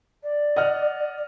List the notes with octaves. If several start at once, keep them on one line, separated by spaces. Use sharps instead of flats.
D5
D#5 F#5 F6